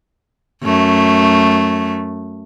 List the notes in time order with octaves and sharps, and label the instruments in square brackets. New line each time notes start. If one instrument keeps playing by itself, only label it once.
[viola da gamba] F#2 A3